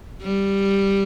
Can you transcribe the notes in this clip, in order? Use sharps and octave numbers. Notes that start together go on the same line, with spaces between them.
G3